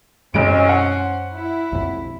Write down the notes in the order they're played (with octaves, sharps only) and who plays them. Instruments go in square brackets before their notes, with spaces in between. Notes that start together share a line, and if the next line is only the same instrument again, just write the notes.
[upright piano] B1 D7 [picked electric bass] F#2 G#3 [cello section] C#4 C5
[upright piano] F#5
[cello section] E4
[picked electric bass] B1 F2